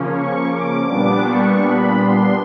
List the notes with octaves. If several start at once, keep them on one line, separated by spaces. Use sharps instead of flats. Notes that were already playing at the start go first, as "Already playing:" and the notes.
Already playing: C#3 F3 A#3 C#4
C#6
D6
A#2 G3 B3 D4 D6
C#6
B5
C6